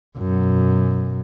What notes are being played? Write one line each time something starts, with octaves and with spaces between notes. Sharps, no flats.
F#2 B2